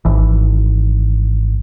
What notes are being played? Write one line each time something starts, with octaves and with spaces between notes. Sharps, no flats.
G#1 E3